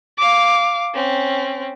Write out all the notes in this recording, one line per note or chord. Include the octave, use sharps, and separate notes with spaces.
F5 D6
C4 C#4